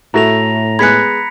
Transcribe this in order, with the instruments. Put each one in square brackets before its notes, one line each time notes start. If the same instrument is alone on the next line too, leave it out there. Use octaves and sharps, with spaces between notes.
[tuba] A2 [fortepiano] A3 E4 F#4 [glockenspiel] A#5 A#6 F7
[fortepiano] G#3 B3 G#5 [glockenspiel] B5 B6 C#7 [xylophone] F#6 G#6